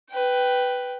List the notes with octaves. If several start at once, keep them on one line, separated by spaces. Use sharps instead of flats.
B4 G5